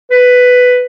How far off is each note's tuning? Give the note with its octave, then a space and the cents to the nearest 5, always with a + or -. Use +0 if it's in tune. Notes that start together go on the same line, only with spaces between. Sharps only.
B4 +5